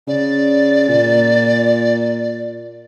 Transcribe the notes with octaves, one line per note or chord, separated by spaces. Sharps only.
C#3 D5
A#2